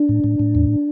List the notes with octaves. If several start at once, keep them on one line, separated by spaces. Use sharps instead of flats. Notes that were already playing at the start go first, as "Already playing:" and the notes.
Already playing: D4
A2
A2
A2
E2